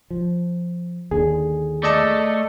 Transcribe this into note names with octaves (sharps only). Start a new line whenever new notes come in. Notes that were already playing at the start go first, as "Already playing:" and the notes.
F3
D#2 D3 G#4
A3 D5 D#5 A5